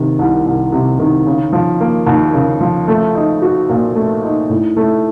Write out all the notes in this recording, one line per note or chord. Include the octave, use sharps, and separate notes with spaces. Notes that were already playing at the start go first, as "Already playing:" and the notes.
Already playing: C3 D#3
C2
C2
C3
D#3
C#3
F3
A#3
D#2
C#3
F3
A3
D#4
F#4
A#2
A3
D#4
A2
A3